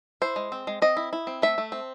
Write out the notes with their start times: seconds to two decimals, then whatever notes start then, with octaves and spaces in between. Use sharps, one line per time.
0.22 E4 C5
0.36 G#3
0.52 C4
0.67 G#3
0.82 C4 D#5
0.97 E4
1.13 E4
1.27 C4
1.42 A3 E5
1.58 A3
1.72 C4